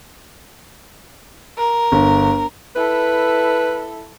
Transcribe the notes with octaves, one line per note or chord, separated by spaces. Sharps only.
A#4
G1
E4 A4 B4